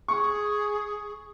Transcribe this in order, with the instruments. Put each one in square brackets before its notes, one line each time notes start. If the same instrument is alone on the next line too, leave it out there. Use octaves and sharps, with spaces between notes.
[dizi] G#4 [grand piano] C#6